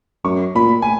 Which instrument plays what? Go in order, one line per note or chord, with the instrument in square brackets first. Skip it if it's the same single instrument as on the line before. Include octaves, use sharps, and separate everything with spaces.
[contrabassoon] F#2 [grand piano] C#6
[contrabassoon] A#2 [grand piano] B5
[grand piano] G#5